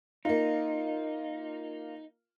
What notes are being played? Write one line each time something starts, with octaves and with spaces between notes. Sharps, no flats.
A#3 D#4 F4